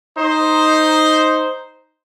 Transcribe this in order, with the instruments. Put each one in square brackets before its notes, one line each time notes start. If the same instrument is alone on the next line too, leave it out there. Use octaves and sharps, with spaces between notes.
[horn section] D#4 C5